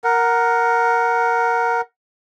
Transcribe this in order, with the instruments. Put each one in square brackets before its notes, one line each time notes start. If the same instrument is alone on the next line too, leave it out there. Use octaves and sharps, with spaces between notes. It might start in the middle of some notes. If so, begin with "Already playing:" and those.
[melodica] A#4 F#5